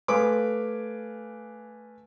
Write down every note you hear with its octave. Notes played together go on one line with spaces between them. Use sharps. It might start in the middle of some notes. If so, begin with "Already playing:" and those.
A3 B4 F5 G#5 D6